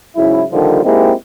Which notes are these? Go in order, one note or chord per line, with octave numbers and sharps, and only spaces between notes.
G#2 C#3 F#3 E4
A#2 D3 D#3 F3 G3
G#3 A#3 C4 D#4 E4 G4